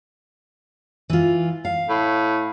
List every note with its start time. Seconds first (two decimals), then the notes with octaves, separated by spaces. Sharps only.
1.10 E3 F4
1.65 F5
1.89 A2